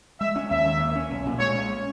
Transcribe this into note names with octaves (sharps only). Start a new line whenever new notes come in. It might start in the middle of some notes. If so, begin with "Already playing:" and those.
G#3 E5
C#4
D#2 E5
D#3
A#3
C#4
B1
A#2
G#3 C#5
C#4